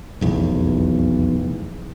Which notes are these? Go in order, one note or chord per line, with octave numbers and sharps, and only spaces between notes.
F1 B1 E2